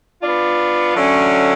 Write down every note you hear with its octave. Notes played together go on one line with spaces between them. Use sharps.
B3 D4 F4
D3 F#3 A3 C#4